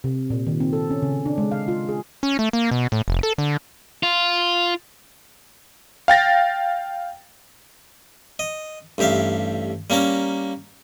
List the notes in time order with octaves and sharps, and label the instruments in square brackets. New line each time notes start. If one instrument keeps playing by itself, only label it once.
[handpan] C3
A#2
D#3
C4
A4
C#4
C#3
D4
G#3
F5
F4
G#4
[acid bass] C#4
A3
A#3
B2
A2
F1
A4
D3
[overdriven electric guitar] F4
[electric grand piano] F5 G5 A6 A#6
[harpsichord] D#5
A1 G2 G4 E5 F5
G3 A#3 C#4 A#5 D6